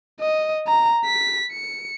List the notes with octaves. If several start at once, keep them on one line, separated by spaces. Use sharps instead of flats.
D#5
A#5
B6
C#7